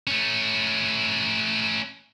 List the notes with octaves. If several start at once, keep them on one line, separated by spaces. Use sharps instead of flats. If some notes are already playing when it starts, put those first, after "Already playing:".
A3 C#4